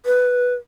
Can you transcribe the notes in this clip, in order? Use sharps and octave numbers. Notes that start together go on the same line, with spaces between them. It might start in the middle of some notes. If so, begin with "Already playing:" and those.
B4